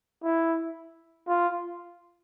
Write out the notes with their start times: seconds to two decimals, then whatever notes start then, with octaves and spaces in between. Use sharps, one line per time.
0.24 E4
1.28 F4